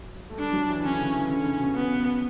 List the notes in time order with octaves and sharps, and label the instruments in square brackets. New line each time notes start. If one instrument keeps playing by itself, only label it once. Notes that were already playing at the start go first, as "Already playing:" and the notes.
Already playing: [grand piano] F#3
A3
[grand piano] G3 [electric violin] D4
[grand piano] F#3
E3
[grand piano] D3 [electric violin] C#4
[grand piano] C#3
E3
[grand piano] D3 [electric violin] C#4
[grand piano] C#3
B2
[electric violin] B3